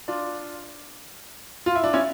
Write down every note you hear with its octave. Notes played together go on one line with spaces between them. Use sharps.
D4 F4
F4
E4
D4
C#4 E4